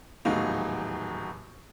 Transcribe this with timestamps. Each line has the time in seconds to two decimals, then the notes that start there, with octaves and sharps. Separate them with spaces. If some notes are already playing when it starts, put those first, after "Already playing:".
0.25 D#1 E2 A2 F#3 D#4 F5